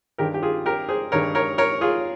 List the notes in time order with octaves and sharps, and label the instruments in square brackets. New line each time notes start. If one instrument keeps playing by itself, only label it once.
[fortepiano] G2 D#3 G#3 G4 A#4
G4
F4 G#4
G4 A#4
G#4 C5
G2 D#3 G#3 A#4 C#5
A#4 C#5
A#4 C#5
F4 G#4